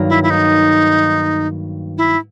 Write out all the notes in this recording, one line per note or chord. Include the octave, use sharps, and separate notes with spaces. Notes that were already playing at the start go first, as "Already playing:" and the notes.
Already playing: G2 D#3 F#3 A#3
E4
E4
D#4
E4